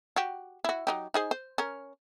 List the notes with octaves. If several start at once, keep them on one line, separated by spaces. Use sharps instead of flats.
F#4 G4
E4 F#4
F#3 D#4 G4
D#4 G#4 C5
C5
C#4 A#4